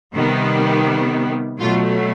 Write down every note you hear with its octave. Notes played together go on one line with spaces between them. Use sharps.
C3 D#3 G3 B3
B2 F#3 A3 F4